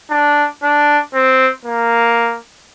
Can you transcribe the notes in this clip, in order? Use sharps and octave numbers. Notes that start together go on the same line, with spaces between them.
D4
D4
C4
A#3